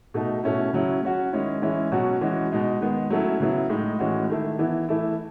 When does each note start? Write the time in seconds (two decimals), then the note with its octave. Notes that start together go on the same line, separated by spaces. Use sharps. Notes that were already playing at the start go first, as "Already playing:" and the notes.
0.14 B2 A3 D#4
0.44 B2 A3 C#4 E4
0.73 C#3 F#3 C#4 E4
1.03 F#3 C#4 F#4
1.33 D#3 G#3 C#4 E4
1.62 E3 G#3 C#4 E4
1.92 B2 F#3 C#4 F#4
2.21 E3 G#3 C#4 F#4
2.52 B2 G#3 D#4
2.81 D#3 G#3 B3
3.10 F#3 A3 C#4 E4
3.40 C#3 F#3 B3 E4
3.69 A2 G#3 D#4
3.99 A2 E3 G#3 C#4 F#4
4.30 D#3 A3 E4
4.59 E3 B3 E4
4.89 E3 A3 E4